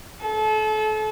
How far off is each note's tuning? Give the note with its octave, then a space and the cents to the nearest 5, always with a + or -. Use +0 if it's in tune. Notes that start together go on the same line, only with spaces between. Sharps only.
A4 -35